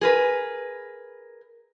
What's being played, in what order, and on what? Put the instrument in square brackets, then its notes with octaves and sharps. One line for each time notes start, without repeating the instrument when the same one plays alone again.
[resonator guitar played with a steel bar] G#4 A#4 B4